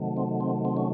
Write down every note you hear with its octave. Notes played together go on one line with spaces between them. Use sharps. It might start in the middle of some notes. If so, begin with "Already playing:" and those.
Already playing: C3 D#3 F#3 A3
C4
C4
C4
C#4